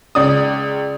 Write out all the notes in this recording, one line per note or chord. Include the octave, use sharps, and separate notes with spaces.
C#2 D5 D#6